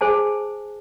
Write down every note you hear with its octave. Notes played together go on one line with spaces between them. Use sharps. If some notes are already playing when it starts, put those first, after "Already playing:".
G#4 C5 G#5 A5